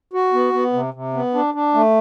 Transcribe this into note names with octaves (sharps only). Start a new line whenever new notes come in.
F#4
B3
B3
C3
C3
B3
D4
D4
A3